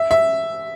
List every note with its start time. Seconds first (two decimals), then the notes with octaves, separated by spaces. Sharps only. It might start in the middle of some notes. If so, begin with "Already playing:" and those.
Already playing: E5
0.11 E5